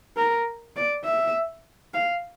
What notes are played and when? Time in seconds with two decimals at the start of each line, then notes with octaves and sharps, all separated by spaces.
0.17 A#4
0.76 D5
1.05 E5
1.94 F5